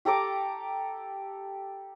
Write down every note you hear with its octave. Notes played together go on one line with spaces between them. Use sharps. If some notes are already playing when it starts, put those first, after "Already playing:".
G4 A4 A#5 D6